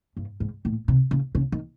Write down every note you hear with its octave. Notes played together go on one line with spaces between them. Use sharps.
G2
G#2
A2
C3
C#3
C#3
D#3